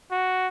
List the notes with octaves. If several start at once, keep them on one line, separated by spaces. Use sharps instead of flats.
F#4